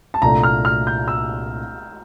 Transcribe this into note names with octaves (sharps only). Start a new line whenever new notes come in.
A5
C2 A#2 A3 D4 A#5
F6
F6
G6
E6